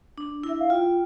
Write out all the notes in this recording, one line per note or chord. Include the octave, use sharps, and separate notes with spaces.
D4
E4
E5
F5
F4 G5